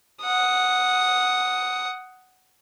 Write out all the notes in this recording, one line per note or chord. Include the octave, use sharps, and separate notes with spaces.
F#5 D#6